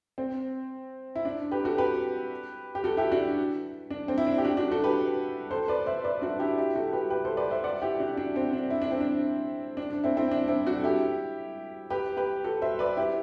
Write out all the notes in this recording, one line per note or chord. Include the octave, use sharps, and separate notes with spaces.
C4
E4
D4
G4 B4
F#4 A4
G4 B4
G4
F#4 A4
E4 G4
D4 F#4
D4
C4
E4
D4
G4
D4 F#4
D4 F#4
F#4 A4
G4 B4
A4 C5
B4 D5
C5 E5
B4 D5
D4 F#4
E4 G4
E4 G4
F#4 A4
G4 B4
G4 B4
A4 C5
B4 D5
C5 E5
D5 F#5
E4 G4
D4 F#4
D4
C4
D4
E4
D4
C4
D4
D4
D4
C4 E4
C4 E4
D4
C4 E4
D4 F#4
A4
E4 G4
G4 B4
G4 B4
F#4 A4
C5 E5
B4 D5
E4 G4